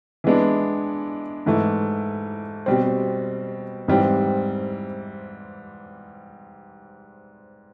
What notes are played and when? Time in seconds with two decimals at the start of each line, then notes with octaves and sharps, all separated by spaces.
0.24 E3 G#3 B3 D4
1.46 G#2 E3 A3
2.66 B2 G3 C4
3.88 G#2 E3 G3 C4